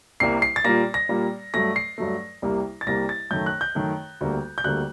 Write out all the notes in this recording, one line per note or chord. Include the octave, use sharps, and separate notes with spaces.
C2 C3 G3 A#3 C7
C7
A6
A#2 G3 A#3 A#6
A#6
A#2 G3 A#3
G2 F#3 A3 A#6
C7
G2 F#3 A3
C2 C3 G3 A#3
A6
C2 C3 G3 A#3 A#6
A6
F#2 D#3 A3 G6
F#6
G6
F#2 D#3 A3
D2 D3 G3 A#3
G6
D2 D3 G3 A#3 F#6